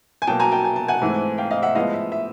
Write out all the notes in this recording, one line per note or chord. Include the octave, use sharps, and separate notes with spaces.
G#5
B2 F#3 A#3 G5 A5
G#5 A#5
G5 A5
G#5
A5
F#5 G#5
G#2 E3 A3 C4
F5 G5
D#5 F5
E5 F#5
A2 F3 G#3 B3 D#5 F5
E5
E5